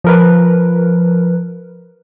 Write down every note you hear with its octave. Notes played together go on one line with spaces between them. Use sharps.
F3 A#4 B4